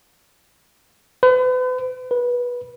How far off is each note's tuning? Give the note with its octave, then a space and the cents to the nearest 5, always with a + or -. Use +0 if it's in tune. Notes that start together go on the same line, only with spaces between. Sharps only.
B4 +40
B4 -20